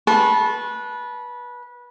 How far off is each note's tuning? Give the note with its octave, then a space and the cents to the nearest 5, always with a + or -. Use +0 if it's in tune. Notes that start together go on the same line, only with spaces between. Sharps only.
B4 -20 A5 -20 C6 +45